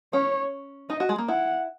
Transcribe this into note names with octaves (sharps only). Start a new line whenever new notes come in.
C#4 C#5
D#4 D#5
F#4
G#3
A#3
E4 F#5